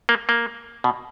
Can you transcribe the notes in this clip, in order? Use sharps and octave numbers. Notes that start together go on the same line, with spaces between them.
A#3
A#3
B2